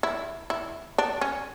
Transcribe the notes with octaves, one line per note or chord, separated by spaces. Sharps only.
E4
E4
D4
C#4